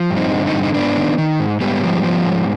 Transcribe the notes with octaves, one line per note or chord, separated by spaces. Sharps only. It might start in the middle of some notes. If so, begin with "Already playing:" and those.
Already playing: F3
G2
C4 D#4
D3
C4 D#4
G2
D#4
G#2 B3 D4
D#3
D#3
G#2
G#2 G3 B3
F3
F3
G#2